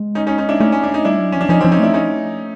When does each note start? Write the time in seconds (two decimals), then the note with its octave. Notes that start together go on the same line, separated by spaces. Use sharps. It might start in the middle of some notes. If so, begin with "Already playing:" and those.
Already playing: G#3
0.15 C#4 D#4
0.27 C#4 D#4
0.38 C#4 D#4
0.49 D4 E4
0.60 A3 C#4 D#4
0.72 C#4
0.83 D4
0.94 D#4
1.05 G3 D4 E4
1.20 F#3
1.32 F3 C#4
1.41 D4
1.49 F3 C#4 D#4
1.61 C4 D4
1.64 F3
1.72 C#4 D#4
1.79 A3 D4 E4
1.94 C#4 D#4